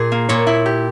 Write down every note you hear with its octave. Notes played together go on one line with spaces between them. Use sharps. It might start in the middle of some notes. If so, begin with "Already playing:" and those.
Already playing: A#2 G#4
A#3
A#2 C#5
E4
G4